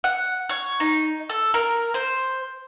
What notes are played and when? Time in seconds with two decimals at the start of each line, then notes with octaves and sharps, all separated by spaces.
0.04 F#5
0.49 C#5
0.80 D#4
1.30 A4
1.54 A#4
1.94 C5